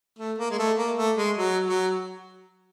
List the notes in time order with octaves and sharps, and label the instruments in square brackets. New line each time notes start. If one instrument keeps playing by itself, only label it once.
[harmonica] A3
A#3
G#3
A3
A#3
A3
G#3
F#3
F#3